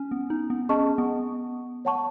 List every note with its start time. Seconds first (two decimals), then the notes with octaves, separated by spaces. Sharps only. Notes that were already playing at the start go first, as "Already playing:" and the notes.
Already playing: C#4
0.11 B3
0.30 D#4
0.50 B3
0.69 C#4 G#4 D#5 A5 C#6
0.98 B3
1.85 C#5 F#5 A5 C#6